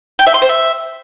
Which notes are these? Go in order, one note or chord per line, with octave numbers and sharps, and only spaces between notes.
G5
E5
C6
C5
E5